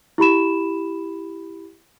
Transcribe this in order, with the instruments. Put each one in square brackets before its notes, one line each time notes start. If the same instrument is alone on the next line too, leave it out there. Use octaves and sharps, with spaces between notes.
[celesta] E4 G4 B5 E7